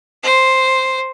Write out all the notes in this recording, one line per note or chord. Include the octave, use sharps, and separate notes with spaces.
C5